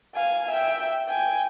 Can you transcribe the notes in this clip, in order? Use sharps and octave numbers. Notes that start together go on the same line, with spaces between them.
F5 G#5
E5 G5
G5 G#5